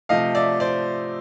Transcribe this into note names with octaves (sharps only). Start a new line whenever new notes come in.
C3 F3 A3 D#5 F5
D5 E5
C5 D5